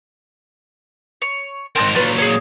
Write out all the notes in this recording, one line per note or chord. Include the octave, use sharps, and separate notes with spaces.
C#5
G#2 C4 A#4 A5 F#6
A#2 F#3 F4 B4
G#4 C#5